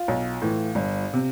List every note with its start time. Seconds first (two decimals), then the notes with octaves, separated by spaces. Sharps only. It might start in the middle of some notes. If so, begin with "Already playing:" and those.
Already playing: F4
0.08 B1
0.42 A2 E3
0.75 G1
1.13 C3